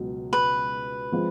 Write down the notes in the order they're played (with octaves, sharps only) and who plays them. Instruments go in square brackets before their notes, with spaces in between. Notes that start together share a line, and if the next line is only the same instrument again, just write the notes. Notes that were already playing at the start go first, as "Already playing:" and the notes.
Already playing: [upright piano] C#2 B2 F#3
[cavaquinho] B4
[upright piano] F3 G#3 C4 F4